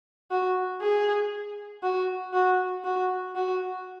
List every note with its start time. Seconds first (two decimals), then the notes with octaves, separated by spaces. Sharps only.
0.31 F#4
0.81 G#4
1.83 F#4
2.33 F#4
2.84 F#4
3.36 F#4